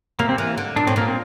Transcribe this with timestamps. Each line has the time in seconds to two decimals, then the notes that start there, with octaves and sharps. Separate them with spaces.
0.19 C3 A#3
0.29 C4
0.38 E3 A#3
0.57 D3
0.76 A#2 D4
0.87 A2 C4
0.96 A#2 A#3
1.08 C4